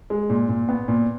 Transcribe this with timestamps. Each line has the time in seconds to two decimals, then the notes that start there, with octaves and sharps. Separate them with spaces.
0.10 G#3
0.30 A#2
0.49 A#2
0.69 B3
0.88 A#2